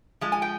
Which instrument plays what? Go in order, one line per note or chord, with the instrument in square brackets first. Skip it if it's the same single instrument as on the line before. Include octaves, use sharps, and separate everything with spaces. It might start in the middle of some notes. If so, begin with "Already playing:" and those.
[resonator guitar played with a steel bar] F3 G#3
G#5
G5